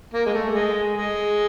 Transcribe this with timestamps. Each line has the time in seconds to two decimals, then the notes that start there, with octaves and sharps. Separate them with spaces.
0.14 A#3
0.26 G#3
0.34 A3
0.54 G#3
0.94 G#3